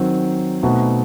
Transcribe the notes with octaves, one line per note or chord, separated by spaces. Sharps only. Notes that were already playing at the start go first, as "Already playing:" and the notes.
Already playing: D#3 F#3 C4
B2 A3 C4 D#4 F#4